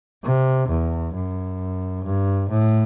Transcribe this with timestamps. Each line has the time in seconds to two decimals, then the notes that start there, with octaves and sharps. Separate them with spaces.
0.24 C3
0.69 E2
1.15 F#2
2.05 G2
2.50 A2